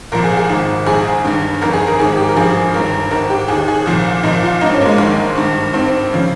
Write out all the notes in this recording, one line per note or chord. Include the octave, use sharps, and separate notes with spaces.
C2 A#2 F3 A#4
G#4
G#4
G#1 G#2 D#3
A#1 G#2 D#3 G#4
G1 G2 D#3
G1 F2 D#3 A#4
G#4
A#4
G#1 G#2 D#3 G#4
G4
A#4
G#1 G2 F3 G#4
G1 G2 D#3 A#4
G#1 G#2 D#3 A#4
G4
D#2 D#3 G#4
G#4
C2 A#2 F3
C2 A#2 F3 D#4
F4
G#1 G2 D#3 D#4
C#4
A#3
G#3
A#1 G#2 D#3
G#1 G2 D#3
G#1 G2 D#3 C4
C#3 F3